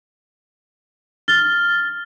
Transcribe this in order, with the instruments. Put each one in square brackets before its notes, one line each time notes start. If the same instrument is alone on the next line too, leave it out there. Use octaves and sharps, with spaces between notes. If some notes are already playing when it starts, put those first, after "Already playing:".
[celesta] F6 A6 G7